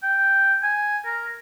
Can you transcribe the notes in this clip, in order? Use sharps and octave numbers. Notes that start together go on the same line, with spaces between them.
G5
G#5
A#4